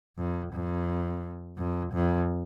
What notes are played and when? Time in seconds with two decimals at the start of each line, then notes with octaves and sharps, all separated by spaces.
0.18 F2
0.53 F2
1.58 F2
1.93 F2